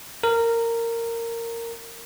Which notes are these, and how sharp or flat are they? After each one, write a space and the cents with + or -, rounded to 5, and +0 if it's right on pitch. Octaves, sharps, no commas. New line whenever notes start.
A#4 -15